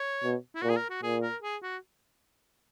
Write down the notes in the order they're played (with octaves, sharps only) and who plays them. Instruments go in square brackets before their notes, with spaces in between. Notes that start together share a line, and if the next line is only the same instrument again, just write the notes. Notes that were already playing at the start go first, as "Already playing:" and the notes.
Already playing: [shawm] C#5
[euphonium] B2
[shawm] E4
[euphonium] A#2 [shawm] F#4
[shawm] G#4
A#4
F#4
[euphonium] A#2 [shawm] G#4
[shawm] A#4
G#4
F#4